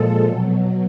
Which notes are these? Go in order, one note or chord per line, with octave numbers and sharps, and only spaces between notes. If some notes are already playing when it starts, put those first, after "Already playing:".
Already playing: A#2 F3 G#3 A4
B2 F#3